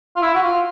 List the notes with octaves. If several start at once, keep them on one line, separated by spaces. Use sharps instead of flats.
F4
E4
F#4
F4